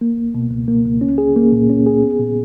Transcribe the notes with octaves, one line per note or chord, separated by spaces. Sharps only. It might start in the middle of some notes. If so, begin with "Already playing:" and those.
A#3
C#2
B2
C#2
A#3
C#2
C#4
G#4
A#3
A#2
C#4
G#4
B3
A#2